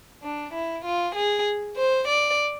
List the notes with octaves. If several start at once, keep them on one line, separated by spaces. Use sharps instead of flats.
D4
E4
F4
G#4
C5
D5